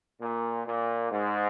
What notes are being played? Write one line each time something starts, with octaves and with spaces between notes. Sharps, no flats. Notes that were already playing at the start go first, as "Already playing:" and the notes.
A#2
A#2
G#2